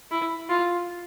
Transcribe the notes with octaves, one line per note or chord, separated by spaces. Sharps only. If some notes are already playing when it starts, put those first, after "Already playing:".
E4
F4